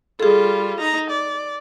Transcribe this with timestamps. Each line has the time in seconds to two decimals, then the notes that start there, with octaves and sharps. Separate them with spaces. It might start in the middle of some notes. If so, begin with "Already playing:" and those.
0.20 G3 F4 G#4 A4
0.80 D#4 A#5
1.10 D5